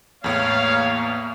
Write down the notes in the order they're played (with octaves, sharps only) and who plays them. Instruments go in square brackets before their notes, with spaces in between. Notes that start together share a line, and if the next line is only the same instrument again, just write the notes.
[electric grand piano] E2 A2 [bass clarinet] A#3 [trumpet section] C#5 F5